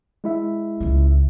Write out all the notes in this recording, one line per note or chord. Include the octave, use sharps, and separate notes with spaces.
G#3 E4 E5
C#2 C#4